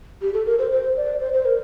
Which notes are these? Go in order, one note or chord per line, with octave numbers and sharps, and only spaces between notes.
G4
A4
A#4
C5
C5
D5
C5
C5
A#4